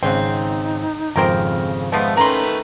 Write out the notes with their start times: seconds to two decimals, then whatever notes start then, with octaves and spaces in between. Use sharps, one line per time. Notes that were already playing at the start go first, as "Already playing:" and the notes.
0.03 G#1 C#3 C4 D#4 F#5
1.16 G#1 F2 C#3 C4 A#4 G5
1.92 F3 G#3 A3 B3
2.17 D#3 A3 C#4 B4 A#5 C6